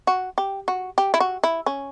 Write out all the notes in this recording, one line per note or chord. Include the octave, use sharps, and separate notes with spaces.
F#4
G4
F#4
G4
E4
F#4
E4
C#4